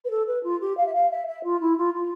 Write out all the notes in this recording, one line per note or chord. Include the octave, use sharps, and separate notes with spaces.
B4
A4
B4
F4
G4
F5
E5
F5
E5
E5
F4
E4
F4
F4